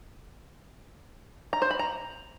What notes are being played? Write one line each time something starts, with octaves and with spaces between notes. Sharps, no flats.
A#5
C5
B5
A#5